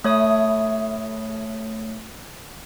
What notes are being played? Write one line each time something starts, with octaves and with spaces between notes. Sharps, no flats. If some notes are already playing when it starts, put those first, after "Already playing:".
A2 A3 E4 C#5 D#6